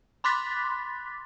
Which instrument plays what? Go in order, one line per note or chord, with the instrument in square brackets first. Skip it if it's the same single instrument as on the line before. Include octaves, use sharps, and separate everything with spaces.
[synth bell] B5 C6 D6 F#6 A6 B6